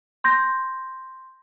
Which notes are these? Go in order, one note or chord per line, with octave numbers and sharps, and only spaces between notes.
C6 G6 A#6